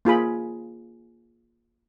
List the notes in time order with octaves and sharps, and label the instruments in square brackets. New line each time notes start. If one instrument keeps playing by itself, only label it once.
[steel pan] A#3 F4 G#4 B5